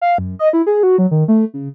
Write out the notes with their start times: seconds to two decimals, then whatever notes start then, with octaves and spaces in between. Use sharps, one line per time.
0.02 F5
0.18 F#2
0.39 D#5
0.53 E4
0.67 G#4
0.83 F#4
0.98 F#3
1.11 D#3
1.28 A3
1.54 C#3